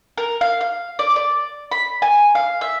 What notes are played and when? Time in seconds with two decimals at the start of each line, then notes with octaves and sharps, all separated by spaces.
0.18 A#4
0.41 F5
0.61 F5
0.99 D5
1.16 D5
1.71 B5
2.02 G#5
2.35 F5
2.61 E5